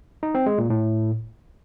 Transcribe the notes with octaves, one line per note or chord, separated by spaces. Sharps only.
D#4
C4
G#3
A#2
A2